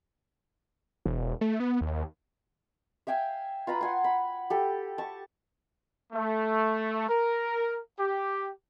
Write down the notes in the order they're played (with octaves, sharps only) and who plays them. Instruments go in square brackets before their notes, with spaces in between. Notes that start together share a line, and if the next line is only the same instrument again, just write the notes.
[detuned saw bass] E1
A3
B3
D#2
[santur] E5 F5 G5 G#5
F4 B4 A#5 B5
F#5 G#5 C6
B5
G4 A4
A5 C#6
[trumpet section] A3
A#4
G4